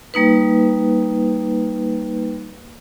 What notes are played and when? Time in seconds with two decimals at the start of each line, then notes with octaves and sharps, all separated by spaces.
0.14 G3 A#3 D#4 B4